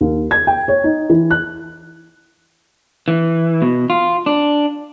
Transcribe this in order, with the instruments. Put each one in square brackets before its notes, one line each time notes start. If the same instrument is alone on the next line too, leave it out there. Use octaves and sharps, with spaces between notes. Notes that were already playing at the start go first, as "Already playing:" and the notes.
[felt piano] D#2
G#6
G5
C#5
D#4
E3
F#6
[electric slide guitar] E3
B2
F4
D4